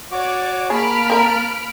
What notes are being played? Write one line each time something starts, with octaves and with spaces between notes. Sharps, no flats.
F#4 C#5 D5 D6
A#3 G#4 A5 B5 F6 D7
C4 A#4 A#5